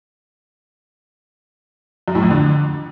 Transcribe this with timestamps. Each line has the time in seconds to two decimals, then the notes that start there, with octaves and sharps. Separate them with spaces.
2.08 F#2
2.15 A2
2.23 F2
2.30 D3